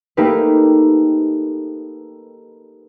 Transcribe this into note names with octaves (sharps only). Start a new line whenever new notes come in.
A3 A#3 D#4 G4 B4